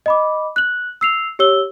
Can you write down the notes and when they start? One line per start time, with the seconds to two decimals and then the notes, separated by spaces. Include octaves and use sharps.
0.06 D#5 B5 D6
0.56 F#6 F#7
1.01 E6 C7 F7
1.39 G4 C#5 E6 G7